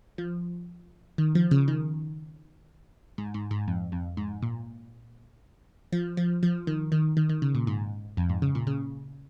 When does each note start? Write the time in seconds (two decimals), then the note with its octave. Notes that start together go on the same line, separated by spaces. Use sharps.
0.18 F3
1.18 D#3
1.35 F3
1.51 C#3
1.68 D#3
3.18 G#2
3.34 G#2
3.51 G#2
3.68 F2
3.92 F2
4.17 G#2
4.42 A#2
5.92 F3
6.17 F3
6.43 F3
6.67 D#3
6.92 D#3
7.17 D#3
7.29 D#3
7.42 C#3
7.55 A#2
7.67 G#2
8.17 F2
8.29 G#2
8.42 C#3
8.55 A#2
8.67 C#3